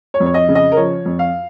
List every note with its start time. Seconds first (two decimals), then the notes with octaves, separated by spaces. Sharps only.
0.14 C#5
0.20 F2
0.26 C#5
0.34 D#5
0.49 C#3
0.55 D#5
0.72 A#4
0.77 F3 C#5
1.05 F2
1.19 F5